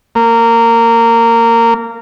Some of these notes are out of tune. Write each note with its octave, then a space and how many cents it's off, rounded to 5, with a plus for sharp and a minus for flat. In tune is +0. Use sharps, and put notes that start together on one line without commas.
A#3 -15